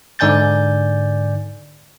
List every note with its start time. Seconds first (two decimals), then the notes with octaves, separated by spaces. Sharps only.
0.19 G#2 D3 D5 G#5 G6 A6